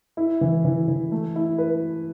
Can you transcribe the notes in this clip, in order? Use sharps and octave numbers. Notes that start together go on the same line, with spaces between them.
E4
E3
E3
E3
A3
E4
B4